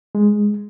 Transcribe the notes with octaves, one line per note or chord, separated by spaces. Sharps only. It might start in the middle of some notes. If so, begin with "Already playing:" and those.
G#3